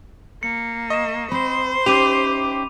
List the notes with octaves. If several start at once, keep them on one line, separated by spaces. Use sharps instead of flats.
A#3 C#7
D#5 C#6 E7
C4 C5 B5
C#4 D#4 G4 E5 D6 D#7 F7